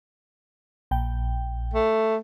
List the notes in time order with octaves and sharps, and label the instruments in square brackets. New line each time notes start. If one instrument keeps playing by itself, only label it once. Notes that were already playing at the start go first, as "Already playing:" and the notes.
[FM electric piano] A#1 G5
[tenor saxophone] A3